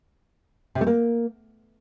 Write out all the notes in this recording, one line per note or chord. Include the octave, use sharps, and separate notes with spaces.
C3
A3
A#3